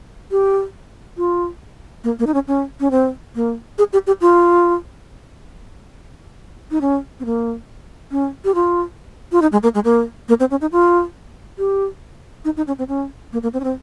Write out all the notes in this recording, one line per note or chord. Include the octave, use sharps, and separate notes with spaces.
G4
F4
A#3
A#3
D#4
C#4
C#4
C#4
C4
A#3
G#4
G4
G4
F4
D#4
C#4
C4
A#3
C#4
G4
F4
F4
D#4
G#3
A#3
G#3
A#3
A#3
C4
C#4
D#4
F4
G4
D#4
D#4
C#4
C4
C#4
A#3
A#3
C4
C#4
C4